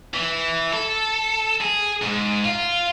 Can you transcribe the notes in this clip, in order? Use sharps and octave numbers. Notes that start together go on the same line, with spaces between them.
E3
A4
G#4
G#2
F4